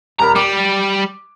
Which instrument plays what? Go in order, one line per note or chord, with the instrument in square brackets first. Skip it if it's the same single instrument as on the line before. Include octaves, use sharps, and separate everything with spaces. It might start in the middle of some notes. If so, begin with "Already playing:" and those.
[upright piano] D#1 A#4 B5 [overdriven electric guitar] A#5
[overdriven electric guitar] G3 [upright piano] D6